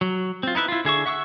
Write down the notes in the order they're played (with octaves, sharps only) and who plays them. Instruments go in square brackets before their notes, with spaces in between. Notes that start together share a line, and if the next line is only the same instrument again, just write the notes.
[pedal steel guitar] F#3
C4 F4
D#4 E4 B4 E5
E4 F4
D3 G#4 E5 C#6
E5 F#5 C#6 D#6 E6